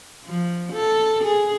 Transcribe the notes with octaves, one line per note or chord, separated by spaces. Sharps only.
F3
A4
G#4